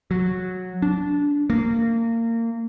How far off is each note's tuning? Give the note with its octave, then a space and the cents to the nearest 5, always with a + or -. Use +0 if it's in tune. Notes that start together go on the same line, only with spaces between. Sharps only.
F#3 -10
D4 -15
A#3 -25